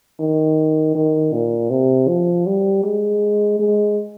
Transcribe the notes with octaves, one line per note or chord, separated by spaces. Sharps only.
D#3
D#3
A#2
C3
F3
G3
G#3
G#3